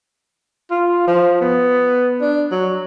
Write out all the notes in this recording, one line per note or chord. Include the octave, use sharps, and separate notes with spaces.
F4
F3
B3
D4
F#3